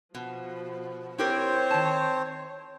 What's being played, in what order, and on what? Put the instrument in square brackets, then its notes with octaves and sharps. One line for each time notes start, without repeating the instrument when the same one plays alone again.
[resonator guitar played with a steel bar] B2 [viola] F3
[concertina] C4 C5 [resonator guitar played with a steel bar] E4 G4 A#4 [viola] C#5
[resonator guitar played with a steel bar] D#3 A5